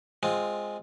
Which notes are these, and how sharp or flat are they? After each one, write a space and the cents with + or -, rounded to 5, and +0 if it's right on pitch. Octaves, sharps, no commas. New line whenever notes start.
G#3 +0 C4 +0 F4 +15